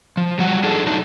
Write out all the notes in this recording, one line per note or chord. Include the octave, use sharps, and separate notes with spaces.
F3
F#3 G3 F#5
D4 D#4 G#4 A4 D5
F#3 A3 D4 D#4